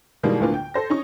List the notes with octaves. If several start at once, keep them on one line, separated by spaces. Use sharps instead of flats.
B2 D#3 E3 G3 G#3 A#3
D2 A2 D3 A#3 B3 F4
G5
A4 C5 A#6
C#4 D#4 C#6